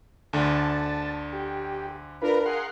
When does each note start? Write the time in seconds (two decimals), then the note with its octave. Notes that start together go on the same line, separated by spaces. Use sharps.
0.33 D2 D3 A5
1.33 G4
2.22 D4 F4 A#4 B4
2.46 G#4 A#4 F5 F#5 C6